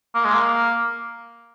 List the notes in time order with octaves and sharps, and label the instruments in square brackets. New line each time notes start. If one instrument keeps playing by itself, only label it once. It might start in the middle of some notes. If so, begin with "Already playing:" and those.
[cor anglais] A#3
G#3
A#3